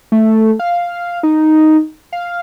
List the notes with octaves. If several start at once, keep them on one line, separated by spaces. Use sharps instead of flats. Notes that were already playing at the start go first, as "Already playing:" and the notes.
A3
F5
D#4
F5